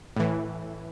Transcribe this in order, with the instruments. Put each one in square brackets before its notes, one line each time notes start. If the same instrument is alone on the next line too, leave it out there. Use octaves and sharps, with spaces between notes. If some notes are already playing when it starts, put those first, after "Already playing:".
[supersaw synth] A2 E3